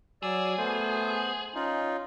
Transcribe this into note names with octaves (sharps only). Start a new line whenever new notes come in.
F#3 G#4 D5 E6
A3 B3 C5
C#4 D#4 F4